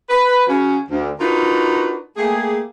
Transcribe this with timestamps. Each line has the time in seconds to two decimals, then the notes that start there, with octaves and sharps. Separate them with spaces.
0.08 B4
0.47 C#3 F#3 C#4
0.89 D2
1.19 D4 D#4 F4 F#4 A#4 B4
2.16 A3 A#3 G4 G#4